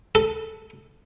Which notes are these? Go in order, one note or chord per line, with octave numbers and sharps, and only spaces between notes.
A4